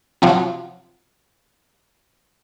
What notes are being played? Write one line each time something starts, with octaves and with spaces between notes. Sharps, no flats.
C3 F3 F#3